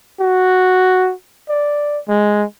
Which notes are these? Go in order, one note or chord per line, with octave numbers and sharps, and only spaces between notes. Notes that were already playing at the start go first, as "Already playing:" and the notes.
F#4
D5
G#3